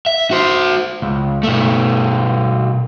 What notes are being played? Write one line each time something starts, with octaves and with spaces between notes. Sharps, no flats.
E5
F#4 C5
C#2
B2 A3